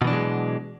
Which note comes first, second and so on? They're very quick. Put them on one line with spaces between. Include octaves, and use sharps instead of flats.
B2 E3 D4 F#3 G#3